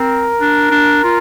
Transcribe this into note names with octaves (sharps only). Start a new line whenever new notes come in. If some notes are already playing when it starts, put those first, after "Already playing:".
Already playing: C4 A#4
D4
D4
F4